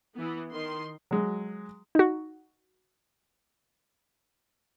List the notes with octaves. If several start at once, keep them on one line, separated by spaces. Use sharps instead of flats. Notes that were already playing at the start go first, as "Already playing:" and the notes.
E3 B3
D#3 C6
F#3 G#3
D#4 F#4